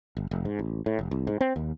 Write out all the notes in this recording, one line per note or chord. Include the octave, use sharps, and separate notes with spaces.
G1
F1
G#2
A1
A2
F1
C2
G#2
C4
D#2